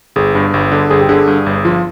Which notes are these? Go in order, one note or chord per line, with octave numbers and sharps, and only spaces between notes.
G1 G#4
G2
G1
D3
G1 G#4
G4
D3 G#4
G2
G1
F3 F4